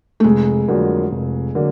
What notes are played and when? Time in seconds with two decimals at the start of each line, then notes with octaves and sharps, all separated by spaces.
0.20 A3
0.24 F1 G#3
0.68 F2 D3 F#3 A#3
1.11 F1
1.55 D3 F#3 A#3